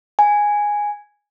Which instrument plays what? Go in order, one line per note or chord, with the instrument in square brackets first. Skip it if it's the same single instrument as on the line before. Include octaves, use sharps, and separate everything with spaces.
[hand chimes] G#5